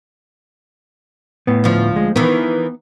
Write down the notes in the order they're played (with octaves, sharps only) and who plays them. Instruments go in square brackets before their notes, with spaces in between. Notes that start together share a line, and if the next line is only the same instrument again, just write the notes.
[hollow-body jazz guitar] A2 B3
[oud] D2 F3
[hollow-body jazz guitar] G#3
[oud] D#3 E3 [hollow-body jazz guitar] B3